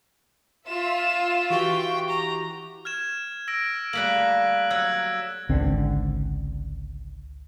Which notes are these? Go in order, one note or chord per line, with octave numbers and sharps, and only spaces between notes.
F4 E5 E7
E3 F#4 G4 G5 C#6
A#5
F6 G#6 E7
E6 A#6 D7
G3 A3 A#3 F#6 B6 F#7
F#3 E6 F#6 G#6
G#1 C#2 D3 C4